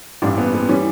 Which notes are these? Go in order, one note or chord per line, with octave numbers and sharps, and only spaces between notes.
A1 G2 E3 G3 D4
B3
B3
E3 G3 C#4